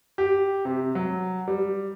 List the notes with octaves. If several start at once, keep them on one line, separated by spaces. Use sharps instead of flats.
G4
C3
F#3
G3